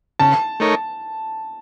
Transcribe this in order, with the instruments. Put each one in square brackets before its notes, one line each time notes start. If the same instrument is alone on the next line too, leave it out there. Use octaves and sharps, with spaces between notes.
[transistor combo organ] C#3 [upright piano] A5
[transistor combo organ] A3 D#4 A#4 C#5